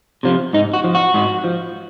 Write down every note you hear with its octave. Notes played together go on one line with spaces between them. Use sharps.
C3 F3
G#2 D#4
F#4
F3
F#4
G#2
F3